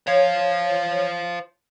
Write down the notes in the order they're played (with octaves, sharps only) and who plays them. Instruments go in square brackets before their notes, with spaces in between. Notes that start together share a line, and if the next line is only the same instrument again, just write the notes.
[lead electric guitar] C5 F5 [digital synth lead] C#5